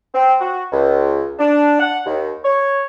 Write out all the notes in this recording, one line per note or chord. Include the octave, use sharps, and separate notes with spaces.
C4
F#4
C#2
D4
F#5
D#2
C#5